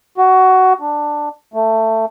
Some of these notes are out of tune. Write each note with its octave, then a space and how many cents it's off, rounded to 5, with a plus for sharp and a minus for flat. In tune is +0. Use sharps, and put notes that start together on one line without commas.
F#4 +15
D4 +10
A3 +15